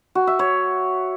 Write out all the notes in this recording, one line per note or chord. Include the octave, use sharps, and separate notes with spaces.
F#4
E5
C#5